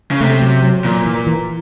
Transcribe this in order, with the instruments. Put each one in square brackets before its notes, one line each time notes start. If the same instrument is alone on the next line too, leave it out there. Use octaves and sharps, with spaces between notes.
[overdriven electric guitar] C#3
[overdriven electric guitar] C3 [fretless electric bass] A3
[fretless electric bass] F#3
F#3
[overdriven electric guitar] A#2 [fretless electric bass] E3
[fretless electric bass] E3
E3